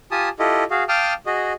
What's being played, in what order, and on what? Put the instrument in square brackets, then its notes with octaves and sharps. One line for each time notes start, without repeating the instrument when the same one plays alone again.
[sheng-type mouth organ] F4 G4 G#5 A5 D#6
E4 F4 G4 A4 D#5
F#4 G#4 F5
F5 G5 A5 D6 D#6 F6
F#4 G#4 D#5